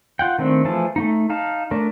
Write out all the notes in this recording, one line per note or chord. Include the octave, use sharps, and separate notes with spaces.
F4 F#5 G5
D#3 A3 C4 D4
E3 F3 A3 G#4 A5
A3 A#3 D#4
D#4 F5 A5
A3 D4 A#4